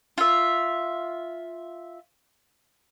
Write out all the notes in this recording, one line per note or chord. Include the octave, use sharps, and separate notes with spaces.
F4 E5